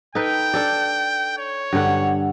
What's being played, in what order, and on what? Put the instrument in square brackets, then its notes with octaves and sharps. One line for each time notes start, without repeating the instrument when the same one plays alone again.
[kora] D#4 A4 B4 [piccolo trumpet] G5
[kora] D4 A4 D5
[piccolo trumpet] C#5
[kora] G2 D3 F#5